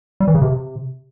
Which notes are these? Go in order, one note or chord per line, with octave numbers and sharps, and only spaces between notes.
G3
E3
C#3
C3